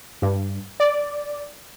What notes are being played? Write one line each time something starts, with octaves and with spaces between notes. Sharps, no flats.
G2
D5